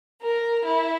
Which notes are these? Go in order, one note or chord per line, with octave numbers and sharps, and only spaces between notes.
A#4
E4